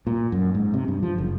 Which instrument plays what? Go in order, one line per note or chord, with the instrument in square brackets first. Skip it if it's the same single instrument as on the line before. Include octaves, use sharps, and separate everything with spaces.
[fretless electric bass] A#2
F#2
G#2
C3
G2
F3
F#1